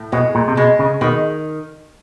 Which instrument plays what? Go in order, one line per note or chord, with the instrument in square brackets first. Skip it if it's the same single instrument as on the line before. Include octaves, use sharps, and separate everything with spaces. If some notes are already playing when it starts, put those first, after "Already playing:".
Already playing: [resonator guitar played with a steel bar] A2
[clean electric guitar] B2 [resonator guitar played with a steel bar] G#3
[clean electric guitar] A#2
C3
[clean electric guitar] B2 [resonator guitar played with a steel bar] G#3
[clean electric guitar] C#3
[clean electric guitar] B2 [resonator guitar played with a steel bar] D#3